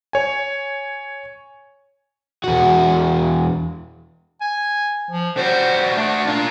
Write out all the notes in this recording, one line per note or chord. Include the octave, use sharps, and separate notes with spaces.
C#5 G#5
E2 F#4
G#5
F3
G3 F#4 C5
A3 D4 F#4
A#3 D4 F4